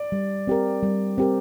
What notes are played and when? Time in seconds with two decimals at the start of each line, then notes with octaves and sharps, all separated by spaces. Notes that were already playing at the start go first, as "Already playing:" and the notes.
Already playing: D5
0.12 G3
0.47 C4 G4 A#4
0.83 G3
1.18 C4 G4 A#4